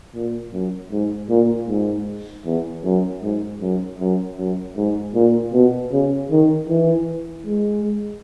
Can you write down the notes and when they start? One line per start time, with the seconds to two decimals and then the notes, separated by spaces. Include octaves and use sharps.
0.15 A#2
0.53 F#2
0.92 G#2
1.30 A#2
1.68 G#2
2.46 E2
2.84 F#2
3.23 G#2
3.61 F#2
4.00 F#2
4.38 F#2
4.77 G#2
5.15 A#2
5.53 B2
5.92 C#3
6.31 D#3
6.69 E3
7.46 G#3